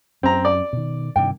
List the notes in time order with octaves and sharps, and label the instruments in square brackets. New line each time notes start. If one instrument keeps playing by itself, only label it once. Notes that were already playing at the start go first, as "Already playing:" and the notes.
[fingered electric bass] F#2 [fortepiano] C4 A#5
[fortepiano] D5
[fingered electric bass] B2 D#3
[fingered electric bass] G2 C3 D#3 [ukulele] D4 E4 G5